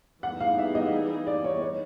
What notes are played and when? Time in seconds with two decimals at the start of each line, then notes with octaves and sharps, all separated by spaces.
0.23 E3 G3 B3 D#4 G#4 F#5
0.40 F5
0.58 E5
0.75 D#5
1.27 D5
1.44 C#5
1.62 C#5